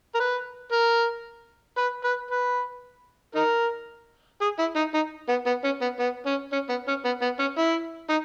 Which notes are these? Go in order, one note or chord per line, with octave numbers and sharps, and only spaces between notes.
A#4
B4
A#4
B4
B4
B4
D#4 A#4
G#4
E4
D#4
D#4
B3
B3
C#4
B3
B3
C#4
C#4
B3
C#4
B3
B3
C#4
E4
D#4